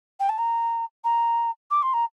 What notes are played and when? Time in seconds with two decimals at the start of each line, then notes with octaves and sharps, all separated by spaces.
0.19 G5
0.29 A5
0.38 A#5
1.04 A#5
1.70 D6
1.82 C6
1.93 A#5